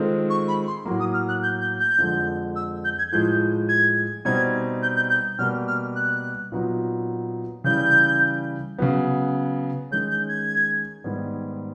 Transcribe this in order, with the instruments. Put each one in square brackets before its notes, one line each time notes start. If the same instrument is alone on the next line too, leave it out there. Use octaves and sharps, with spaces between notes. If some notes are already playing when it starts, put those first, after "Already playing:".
Already playing: [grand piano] D#3 G#3 C4 F4 A4
[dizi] C#6
B5
C6
[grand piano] A2 F#3 A#3
[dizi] D#6
F6
F#6
G6
G6
G6
[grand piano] F2 D3 F3 G#3
[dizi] E6
G6
G#6
[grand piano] A2 F3 G#3 [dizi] G6
[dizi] G#6
[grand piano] B2 G3 C4 D#4 [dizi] G#6
[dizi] G6
G6
G6
[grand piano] B2 G3 A#3 [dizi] F6
[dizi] F6
F#6
[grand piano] A#2 F#3 B3 D#4
[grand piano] C#3 E3 G3 [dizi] G6
[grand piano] C#3 F#3 B3
[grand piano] D#3 G#3 C#4 [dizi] G6
[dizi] G6
G#6
[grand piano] G#2 D#3 G3 B3